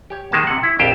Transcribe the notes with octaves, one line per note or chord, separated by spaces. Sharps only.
G4 C#5
D#3 G#3 A#3 A5
C3 F#5
E4
A#1 F2 G4 C5